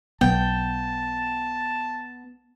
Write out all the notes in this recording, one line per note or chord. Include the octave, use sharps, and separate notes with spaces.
B1 B3 G5 A5